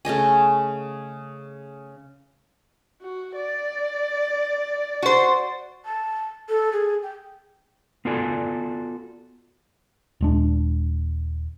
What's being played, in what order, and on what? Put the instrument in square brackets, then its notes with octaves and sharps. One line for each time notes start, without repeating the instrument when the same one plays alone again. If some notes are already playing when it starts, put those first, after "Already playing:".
[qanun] C#3 A3 D#5 G#5
[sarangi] F#4
D5
[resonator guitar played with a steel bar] F#4 C5
[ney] A5
A4
G#4
G5
[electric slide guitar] B3 F4 F#4 A4 D5 G#5
[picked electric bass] D#1 G#3 D4